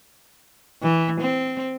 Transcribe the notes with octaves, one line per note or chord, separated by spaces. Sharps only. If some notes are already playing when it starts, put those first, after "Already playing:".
E3
C4